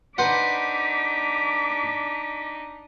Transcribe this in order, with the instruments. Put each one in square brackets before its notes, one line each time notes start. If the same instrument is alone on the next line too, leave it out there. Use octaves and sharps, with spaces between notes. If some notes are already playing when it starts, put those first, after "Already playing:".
[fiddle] D4 D#4 [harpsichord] B4 C5 F#5 [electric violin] D6 B6